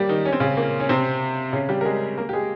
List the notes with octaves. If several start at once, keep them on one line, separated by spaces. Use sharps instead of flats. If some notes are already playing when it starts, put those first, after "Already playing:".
Already playing: G3 A#3 G4
D#3 D#4
C#4
C4
C#3 C#4
A#2 A#3
C#4
C3 C4
C#3 C#4
G3 G4
A#4
G#3 G#4
A#3 A#4
G4
G#3 G#4